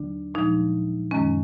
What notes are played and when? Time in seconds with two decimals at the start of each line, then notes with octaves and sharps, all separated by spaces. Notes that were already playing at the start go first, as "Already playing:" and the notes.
Already playing: D#2 D3 F#3 D4
0.34 A#2 F3 G#3 D#4
1.11 F#2 D#3 G#3 C#4